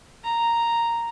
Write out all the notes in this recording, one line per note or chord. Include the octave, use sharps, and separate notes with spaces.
A#5